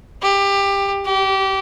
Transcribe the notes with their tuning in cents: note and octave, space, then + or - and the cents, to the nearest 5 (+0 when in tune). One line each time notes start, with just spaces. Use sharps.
G4 +20
G4 -25